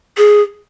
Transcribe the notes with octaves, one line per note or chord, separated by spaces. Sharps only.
G#4